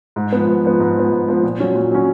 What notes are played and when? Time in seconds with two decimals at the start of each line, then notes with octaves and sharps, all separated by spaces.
0.16 G#2
0.32 F3 B3
0.48 G#2
0.64 F3 B3
0.80 G#2
0.96 F3 B3
1.11 G#2
1.28 F3 B3
1.43 A#2
1.60 F#3 C#4
1.75 A#2
1.92 F#3 C#4